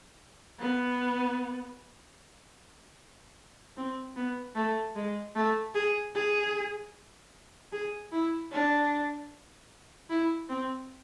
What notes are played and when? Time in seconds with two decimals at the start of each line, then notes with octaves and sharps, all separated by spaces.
0.60 B3
3.77 C4
4.16 B3
4.55 A3
4.96 G#3
5.35 A3
5.75 G#4
6.15 G#4
7.72 G#4
8.12 E4
8.52 D4
10.10 E4
10.49 C4